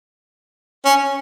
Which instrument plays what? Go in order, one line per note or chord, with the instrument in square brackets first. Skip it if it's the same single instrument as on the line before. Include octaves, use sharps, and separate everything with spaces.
[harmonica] C#4